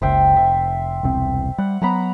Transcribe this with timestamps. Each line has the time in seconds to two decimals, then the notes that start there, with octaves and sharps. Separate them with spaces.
0.02 F#1 C#2 C5 E5 G5
0.36 F1 E5
1.03 E1 C2 C4
1.58 G3 F#5
1.82 F#3 B3 F#5 A#5 B5